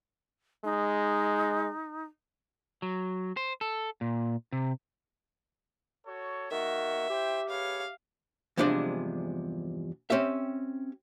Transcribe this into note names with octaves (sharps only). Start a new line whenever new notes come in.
G#3 D#4
F#3
C5
A4
A#2
C3
F#4 A4 C#5
D#3 A#3 F#4 E5
E4 G4 C5 G5
G#4 B4 C#5 F5
E2 G2 C3 F3 G#3 D4
C4 C#4 G4 E5